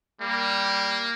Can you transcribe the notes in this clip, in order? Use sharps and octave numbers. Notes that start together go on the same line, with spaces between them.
G3 A#3